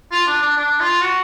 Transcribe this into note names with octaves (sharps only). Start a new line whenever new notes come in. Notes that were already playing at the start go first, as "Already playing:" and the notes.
F4
D4
D4
D4
F4
F#4